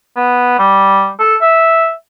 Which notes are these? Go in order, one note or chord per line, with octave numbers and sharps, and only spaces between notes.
B3
G3
A4
E5